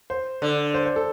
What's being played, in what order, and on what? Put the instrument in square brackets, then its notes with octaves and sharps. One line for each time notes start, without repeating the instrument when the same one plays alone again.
[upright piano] C5
[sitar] D3
[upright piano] C5
C5
A4